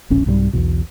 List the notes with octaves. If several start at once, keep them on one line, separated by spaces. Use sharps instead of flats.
E1 A#1 C#4
C2 G#2 F#3 G3
B1 E2 B2